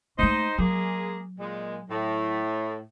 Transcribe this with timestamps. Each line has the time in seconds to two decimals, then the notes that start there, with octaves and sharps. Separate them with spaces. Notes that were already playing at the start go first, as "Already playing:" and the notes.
0.19 A3 A#3 D#4 C5 D#5
0.58 F#3 G#3 A#3 G#4
1.39 A#2 G#3
1.90 A2